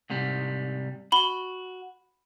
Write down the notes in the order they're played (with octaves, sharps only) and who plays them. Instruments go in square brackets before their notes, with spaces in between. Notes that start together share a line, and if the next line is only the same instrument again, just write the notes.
[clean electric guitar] G#2 C3 G3
[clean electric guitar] F#4 [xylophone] B5 G7